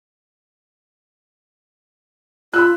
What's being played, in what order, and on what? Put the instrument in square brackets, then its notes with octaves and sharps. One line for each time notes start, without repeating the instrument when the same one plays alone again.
[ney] F4 [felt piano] B5 E6 F#6